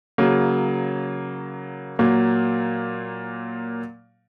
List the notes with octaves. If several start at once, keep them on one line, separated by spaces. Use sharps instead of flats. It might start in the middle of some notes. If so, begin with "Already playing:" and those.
C#3 F#3 A#3
A#2 F#3 A#3